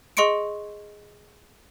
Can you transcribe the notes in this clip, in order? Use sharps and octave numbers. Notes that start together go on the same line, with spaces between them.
G#4 D#5 C6 C#6 C#7 D7